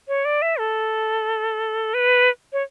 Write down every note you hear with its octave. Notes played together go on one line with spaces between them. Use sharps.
C#5
D5
E5
A4
B4
C#5